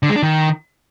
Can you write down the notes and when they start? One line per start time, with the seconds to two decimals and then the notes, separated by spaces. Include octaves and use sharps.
0.03 D3
0.09 G#3
0.16 D4
0.23 D#3